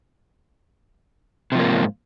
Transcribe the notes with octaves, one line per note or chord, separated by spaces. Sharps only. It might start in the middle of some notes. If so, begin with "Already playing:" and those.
G#2 C3 F3 A#3